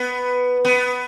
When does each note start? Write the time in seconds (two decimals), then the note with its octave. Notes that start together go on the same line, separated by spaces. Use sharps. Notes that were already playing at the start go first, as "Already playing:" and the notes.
Already playing: B3
0.65 B3